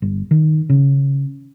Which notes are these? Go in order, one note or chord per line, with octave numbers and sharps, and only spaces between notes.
G1
D#3
C#3